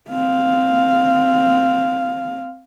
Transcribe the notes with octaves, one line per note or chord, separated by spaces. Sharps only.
C4 F5